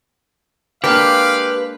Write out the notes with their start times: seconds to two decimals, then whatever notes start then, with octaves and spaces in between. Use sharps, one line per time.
0.84 G#3 A#3 D4 G4 B4 F5